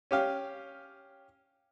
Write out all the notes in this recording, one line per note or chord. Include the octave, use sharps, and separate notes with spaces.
C#4 G4 F5